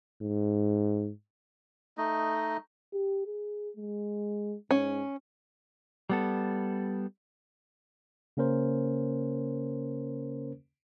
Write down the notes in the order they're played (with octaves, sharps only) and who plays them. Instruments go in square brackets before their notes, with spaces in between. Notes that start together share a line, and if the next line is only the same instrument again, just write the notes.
[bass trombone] G#2
[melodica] A3 D#4 D#5
[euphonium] G4
G#4
G#3
[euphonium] G#2 [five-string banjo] C#4
[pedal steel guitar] G3 B3 A4
[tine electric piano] C#3 A#3 C#4 A#4 C5